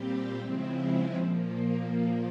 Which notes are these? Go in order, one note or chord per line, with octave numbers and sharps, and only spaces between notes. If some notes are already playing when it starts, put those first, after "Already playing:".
Already playing: A#2 G3 C4 G4
C#3 F3 G#3 C4 E4
A#2 F3 A#3